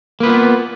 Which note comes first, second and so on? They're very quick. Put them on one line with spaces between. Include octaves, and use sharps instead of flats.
A#3 B4 F4 B3